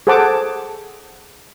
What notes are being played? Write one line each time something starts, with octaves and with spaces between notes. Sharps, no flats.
G#4 A4 C5 F#5 A5 D6